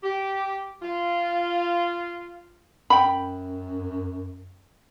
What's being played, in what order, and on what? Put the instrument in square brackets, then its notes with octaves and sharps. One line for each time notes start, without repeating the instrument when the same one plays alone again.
[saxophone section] G4
F4
[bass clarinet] F#2 [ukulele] G5 B5